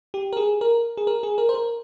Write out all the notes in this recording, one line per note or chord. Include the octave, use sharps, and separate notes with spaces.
G4
A#4
G#4
A#4
G#4
A#4
G#4
A#4
C5
A#4